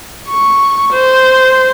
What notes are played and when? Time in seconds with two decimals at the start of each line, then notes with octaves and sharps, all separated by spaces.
0.28 C#6
0.93 C5